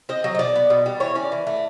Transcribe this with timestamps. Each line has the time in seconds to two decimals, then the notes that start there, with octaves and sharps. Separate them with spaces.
0.09 C4 D#5
0.24 F#3
0.35 D#5
0.39 B2 D5
0.56 B3
0.70 B2
0.86 G3
1.00 E3 C#5
1.15 C#4 D5
1.32 E3
1.47 A3